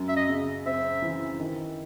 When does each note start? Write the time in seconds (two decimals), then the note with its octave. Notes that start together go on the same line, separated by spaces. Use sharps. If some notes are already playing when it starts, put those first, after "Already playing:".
Already playing: F#2
0.08 E5
0.17 D#5
0.29 C#3
0.66 C4 E5
1.02 E3
1.39 D#3